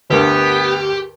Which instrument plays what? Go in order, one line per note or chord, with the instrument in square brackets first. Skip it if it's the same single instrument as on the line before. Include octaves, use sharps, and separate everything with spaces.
[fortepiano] D2 G2 [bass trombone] B3 [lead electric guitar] G4 [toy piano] A#4 B4